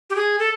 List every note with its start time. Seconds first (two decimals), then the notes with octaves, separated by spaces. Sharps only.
0.10 G4
0.15 G#4
0.39 A4